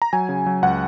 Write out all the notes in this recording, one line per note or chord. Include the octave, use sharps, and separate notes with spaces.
A#5
F#3 G#5
C#3
F#3
C#2 F#5